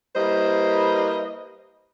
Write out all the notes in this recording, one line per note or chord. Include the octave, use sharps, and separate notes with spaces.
G3 A#3 E4 B4 C5 D#5